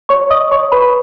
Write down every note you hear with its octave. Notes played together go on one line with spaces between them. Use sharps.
C#5 C#6
D#5 D#6
C#5 C#6
B4 B5